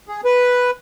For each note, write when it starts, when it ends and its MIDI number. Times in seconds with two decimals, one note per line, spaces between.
0.08 0.21 68
0.25 0.71 71